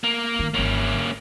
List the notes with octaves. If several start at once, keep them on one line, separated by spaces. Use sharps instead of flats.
A#3
D#3
G#1 E3 A#3 C#4